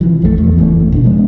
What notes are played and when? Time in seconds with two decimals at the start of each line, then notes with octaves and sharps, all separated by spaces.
0.01 C3 E3 F3
0.22 A#1 F#2 C#3 A3
0.38 E2
0.58 F#1 E3 A3 C#4
0.92 B2 C#4 D4
1.04 A#2 F3 G#3 B3